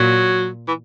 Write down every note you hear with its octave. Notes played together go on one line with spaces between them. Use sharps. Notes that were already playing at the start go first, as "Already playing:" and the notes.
Already playing: A#2 F#3
E3